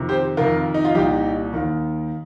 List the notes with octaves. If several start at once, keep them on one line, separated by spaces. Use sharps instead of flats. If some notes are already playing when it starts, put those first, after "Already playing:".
Already playing: F2 C3 D#3
G4 C5
F2 C3 D#3 F4 A#4
D#4
F4
C2 A#2 D#4 G4
D#2 D#3